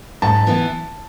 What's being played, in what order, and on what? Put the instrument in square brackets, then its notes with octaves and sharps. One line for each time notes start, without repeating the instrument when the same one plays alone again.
[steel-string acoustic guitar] G#2 [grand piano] A5
[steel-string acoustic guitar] E3 B3 E4